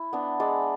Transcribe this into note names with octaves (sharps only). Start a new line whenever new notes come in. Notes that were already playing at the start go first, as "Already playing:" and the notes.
Already playing: E4
B3 D4
G#3 D5